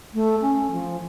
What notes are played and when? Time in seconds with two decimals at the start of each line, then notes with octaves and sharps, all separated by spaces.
0.14 A3
0.41 C#4
0.72 F3